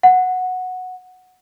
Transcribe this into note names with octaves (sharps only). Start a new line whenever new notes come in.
F#5